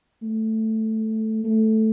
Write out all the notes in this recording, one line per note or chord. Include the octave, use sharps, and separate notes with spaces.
A3
A3